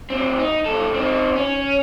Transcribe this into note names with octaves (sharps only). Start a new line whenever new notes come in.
D2 C4
D#4
G2 A4
C4 D#4
C#4